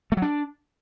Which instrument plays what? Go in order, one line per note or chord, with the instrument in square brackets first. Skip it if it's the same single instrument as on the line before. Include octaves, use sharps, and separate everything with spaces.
[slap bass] A3
F#3
D4